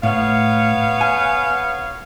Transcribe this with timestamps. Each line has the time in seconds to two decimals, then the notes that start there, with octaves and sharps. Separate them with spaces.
0.03 A2 B3 C#5 F5
1.01 G#5